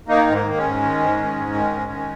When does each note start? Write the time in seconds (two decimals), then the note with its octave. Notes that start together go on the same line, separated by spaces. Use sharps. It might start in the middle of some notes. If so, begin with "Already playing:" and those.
0.08 D#3 A#3 D#4
0.27 G#2
0.33 A#3
0.45 D#3
0.57 G#3 C#4
0.63 G#2
0.82 D#3
0.99 G#2
1.17 D#3
1.36 G#2
1.54 D#3
1.72 G#2
1.91 D#3